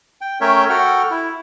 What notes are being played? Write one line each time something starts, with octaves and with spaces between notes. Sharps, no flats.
G5
A3 C#4 A#4 C#5 E5 G5
F#4 A4 F#5 G5 F6
E4